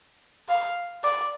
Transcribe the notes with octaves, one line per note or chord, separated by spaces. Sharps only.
F5
D5